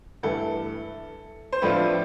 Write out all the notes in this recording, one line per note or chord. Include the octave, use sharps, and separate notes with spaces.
G2 E3 A3 E4 A4
C5
A2 F3 A3 D4 F4 B4